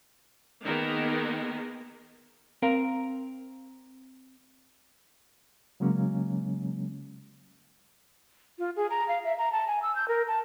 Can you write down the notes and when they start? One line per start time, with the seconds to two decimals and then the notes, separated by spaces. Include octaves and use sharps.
0.64 D#3 A#3 B3 D#4 G#4 A#4
2.62 C4 A#4 F5
5.80 C#3 F#3 G#3 A#3 C#4
8.59 F4
8.76 G#4
8.90 A#5
9.08 F5
9.24 E5
9.39 A#5
9.52 A5
9.67 G#5
9.82 E6
9.95 G6
10.08 A#4
10.28 A5